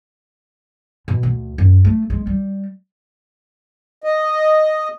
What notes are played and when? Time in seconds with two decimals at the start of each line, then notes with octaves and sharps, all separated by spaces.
1.08 B2
1.23 D2
1.58 F#2
1.85 A3
2.10 G#3
2.27 G3
4.04 D#5